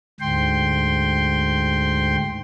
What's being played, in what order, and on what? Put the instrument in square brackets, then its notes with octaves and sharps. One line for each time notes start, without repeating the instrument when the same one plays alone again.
[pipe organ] D2 G#2 G5 C6